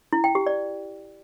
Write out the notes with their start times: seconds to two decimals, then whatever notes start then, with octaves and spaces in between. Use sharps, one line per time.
0.13 E4
0.24 G5
0.35 G4
0.47 D5